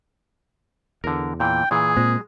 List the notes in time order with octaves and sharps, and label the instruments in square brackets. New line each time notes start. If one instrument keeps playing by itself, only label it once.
[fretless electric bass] E2 [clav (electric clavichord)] D3 A#4
[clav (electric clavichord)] A#2 E3 [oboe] G5
[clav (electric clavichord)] A#2 E3 [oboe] G#4
[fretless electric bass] A#2 C4 [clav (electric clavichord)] G#3